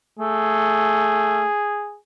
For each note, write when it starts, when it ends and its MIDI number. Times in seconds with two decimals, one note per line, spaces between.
0.19 1.45 57
0.19 1.98 68